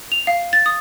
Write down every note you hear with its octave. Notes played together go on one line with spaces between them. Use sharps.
F7
F5
A6
D#6